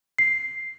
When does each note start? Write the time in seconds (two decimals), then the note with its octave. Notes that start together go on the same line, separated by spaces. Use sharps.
0.18 C7